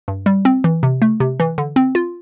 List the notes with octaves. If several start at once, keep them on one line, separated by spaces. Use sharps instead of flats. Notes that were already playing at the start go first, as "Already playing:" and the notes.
G2
G3
C4
E3
C3
A3
C3
E3
D3
C4
F4